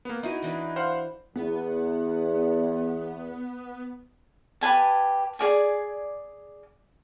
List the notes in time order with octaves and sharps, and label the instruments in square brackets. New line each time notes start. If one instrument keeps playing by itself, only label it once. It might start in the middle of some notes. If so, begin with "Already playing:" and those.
[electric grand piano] A#3 B3
[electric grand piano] D#4 [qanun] E4 F#4 G#5
[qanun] E3 D4 B4
[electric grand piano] C5 F5 F#5
[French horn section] E2 [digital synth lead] B3
[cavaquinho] G4 B4 G#5 A5
G#4 D5 G#5